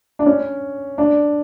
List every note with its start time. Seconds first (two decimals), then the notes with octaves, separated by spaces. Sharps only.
0.19 D4
0.26 C#4
0.98 D4